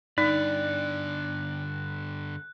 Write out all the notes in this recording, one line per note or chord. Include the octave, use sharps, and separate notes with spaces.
G2 D3 D#4 D5 F#6